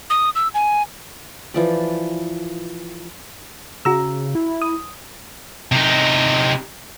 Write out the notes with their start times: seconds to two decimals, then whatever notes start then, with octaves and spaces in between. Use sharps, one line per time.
0.10 D#6
0.35 E6
0.54 G#5
1.54 E3 F3 D5
3.85 C#3 F#4 A#5 E6
4.35 E4
4.62 D#6
5.72 C3 D#4